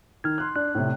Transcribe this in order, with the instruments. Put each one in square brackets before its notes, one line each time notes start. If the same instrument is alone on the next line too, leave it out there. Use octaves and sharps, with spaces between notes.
[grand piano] D#3 [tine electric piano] F6 G#6
[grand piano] C6 F#6
[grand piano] D4 D5 [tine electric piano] F#6
[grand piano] A2 C3